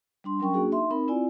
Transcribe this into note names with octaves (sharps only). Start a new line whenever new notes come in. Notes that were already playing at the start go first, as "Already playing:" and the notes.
G3 D4 C6
F#3 C#4 A#4 G5 C#6
A#3 D4 F#4 G#4
D#4 E5 C6
C4 D#4 A#4 B5
C4 E4 F4 D5 G#5